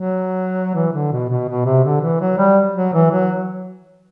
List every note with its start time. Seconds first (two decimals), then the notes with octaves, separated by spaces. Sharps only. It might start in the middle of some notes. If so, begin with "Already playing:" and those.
Already playing: F#3
0.74 E3
0.92 D3
1.11 B2
1.29 B2
1.48 B2
1.65 C3
1.84 D3
2.01 E3
2.21 F#3
2.38 G3
2.75 F#3
2.93 E3
3.10 F#3